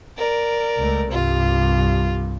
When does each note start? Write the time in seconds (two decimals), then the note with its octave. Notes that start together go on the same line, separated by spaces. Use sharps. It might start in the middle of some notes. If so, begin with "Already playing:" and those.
0.17 A#4 D5
0.78 C#2 A3
1.12 C2 G2 F4